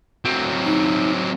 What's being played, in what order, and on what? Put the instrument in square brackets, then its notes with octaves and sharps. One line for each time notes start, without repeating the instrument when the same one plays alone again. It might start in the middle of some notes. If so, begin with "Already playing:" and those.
[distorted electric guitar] F#3 C4
[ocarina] D#4